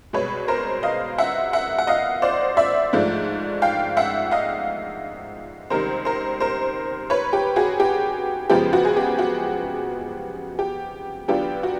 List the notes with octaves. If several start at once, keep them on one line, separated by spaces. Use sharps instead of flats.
C2 B2 G#3 B4 C#5
A#4 C5
D#5 F5
E5 F#5
E5 F#5
F#5
D#5 F5
C5 D5
D5 E5
G#2 F3 A3 D4 F4
F5 G5
E5 F#5
D#5 F5
C#2 C3 D#3 G3 A#4 C5
A#4 C5
A#4 C5
B4 C#5
G4
F#4 G#4
G4
F#2 C#3 F3 G#3 B3 G4
F#4
G#4
G4
F#4
G4
D3 F#3 B3 D4 F4 G4
F#4